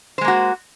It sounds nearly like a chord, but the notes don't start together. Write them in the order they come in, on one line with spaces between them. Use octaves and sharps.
C5 G#3 A#3 F#4